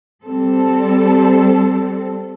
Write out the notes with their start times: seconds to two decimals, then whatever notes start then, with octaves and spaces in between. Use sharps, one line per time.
0.24 G3 C4 A4